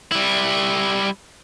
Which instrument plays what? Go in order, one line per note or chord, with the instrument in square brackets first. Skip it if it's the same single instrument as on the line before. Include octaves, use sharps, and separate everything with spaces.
[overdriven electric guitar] G3 E4